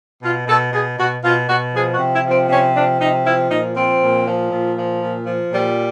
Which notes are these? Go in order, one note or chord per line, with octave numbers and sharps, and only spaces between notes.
B2 F4
B2 A4
B2 G#4
B2 F#4
B2 F4
B2 F#4
F3 G#4
F#4
C3
E4
F3
C4
C3 C#4
F3 D4
C3 D#4
F3 E4
A#2 D#4
F3 C4
A#2
F3
A#2
F3
A#2
F3
A#2 G3